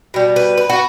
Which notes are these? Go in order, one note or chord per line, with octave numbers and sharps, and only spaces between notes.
B2 G3
B4
B4
F#4